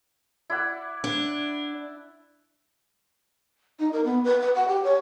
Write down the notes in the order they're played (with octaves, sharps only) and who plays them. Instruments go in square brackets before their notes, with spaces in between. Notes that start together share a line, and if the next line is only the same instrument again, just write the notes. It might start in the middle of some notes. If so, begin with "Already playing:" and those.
[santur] E4 D5 F#5
[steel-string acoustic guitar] D4
[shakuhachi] D#4
A#4
B3
B4
B4
F#5
G4
C#5